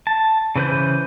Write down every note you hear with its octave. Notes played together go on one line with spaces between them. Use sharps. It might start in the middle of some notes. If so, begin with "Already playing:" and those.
A5
C#3 E3 B4 C5 G6